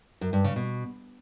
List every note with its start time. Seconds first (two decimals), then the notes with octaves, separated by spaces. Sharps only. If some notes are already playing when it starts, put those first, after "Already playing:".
0.21 F#2
0.33 G2
0.44 C#3
0.56 B2